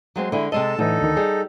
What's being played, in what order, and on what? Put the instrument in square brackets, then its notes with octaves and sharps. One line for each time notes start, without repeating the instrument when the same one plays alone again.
[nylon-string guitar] F#3 G#3 C4
[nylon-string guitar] D3 G#3 [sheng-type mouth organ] E4
[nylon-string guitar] C3 G#3 D#5 [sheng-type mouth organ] A4 A5
[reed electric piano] A2 E3 [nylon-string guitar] D3 [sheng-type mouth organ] D#4 A4
[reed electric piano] D2 D#3
[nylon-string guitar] G3 [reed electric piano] G#4